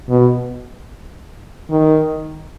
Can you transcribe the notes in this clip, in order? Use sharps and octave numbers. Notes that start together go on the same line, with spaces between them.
B2
D#3